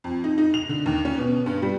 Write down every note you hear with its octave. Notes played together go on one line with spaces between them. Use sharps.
F2
D#4
D#4
F7
D3
D#2
C#4
B2
G2
G3